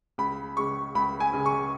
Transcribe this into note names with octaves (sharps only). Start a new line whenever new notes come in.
C#2 B5
C#3 G#3 C#6
C#2 B5
G#5
C#3 G#3
C#6